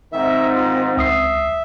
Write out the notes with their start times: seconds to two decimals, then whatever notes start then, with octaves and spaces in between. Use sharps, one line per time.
0.12 G#2 D#3 C4 E5
0.56 F4
0.97 C#2 E5 D#6 C7